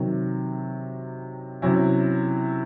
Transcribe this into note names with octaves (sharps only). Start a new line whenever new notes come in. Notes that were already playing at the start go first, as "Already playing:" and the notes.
Already playing: C3 D#3 F#3
C3 F#3 C#4 E4